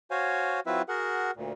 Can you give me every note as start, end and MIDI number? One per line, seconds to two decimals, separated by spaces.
0.11 0.60 66
0.11 0.60 72
0.11 0.60 73
0.11 0.60 77
0.11 0.60 80
0.66 0.82 54
0.66 0.82 60
0.66 0.82 64
0.66 0.82 65
0.66 0.82 71
0.66 0.82 76
0.89 1.31 66
0.89 1.31 68
0.89 1.31 70
0.89 1.31 78
1.36 1.53 38
1.36 1.53 46